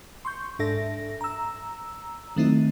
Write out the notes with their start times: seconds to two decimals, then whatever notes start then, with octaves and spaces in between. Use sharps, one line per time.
0.25 C6 C#6 G6
0.59 G#2 D4 A4 E5 A#6
1.21 A#5 E6
2.36 D#3 F#3 A3 C4 D#4 E4